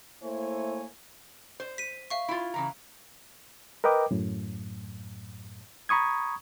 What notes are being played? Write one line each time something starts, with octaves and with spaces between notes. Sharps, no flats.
A3 A#3 E4 C5 C#5 G#5
C5
B6 D#7
E5 F5 C#6
E4 F4
C#3 E3 A#5
A#4 B4 D#5 G5 D6
F#2 A2
A#5 B5 C#6 D#6 G#6